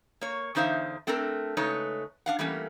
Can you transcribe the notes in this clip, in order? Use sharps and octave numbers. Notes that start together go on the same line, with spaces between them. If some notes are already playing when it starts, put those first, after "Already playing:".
A#3 C#5
E2 D3 D#4 C5 E5 F5
A3 C4 D4 A4 A#4
C#3 G#3 A3 D#4 B4 C#5
D4 F5 F#5
E3 G3 A3 A#3 C#4